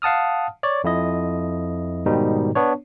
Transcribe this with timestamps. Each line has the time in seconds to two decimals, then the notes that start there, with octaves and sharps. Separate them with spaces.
0.02 F5 F#5 A5 D#6 F6
0.63 C#5 D5
0.84 F2 E4 D#5
2.06 G#2 B2 D#3 G3 D#4
2.56 B3 D4 C#5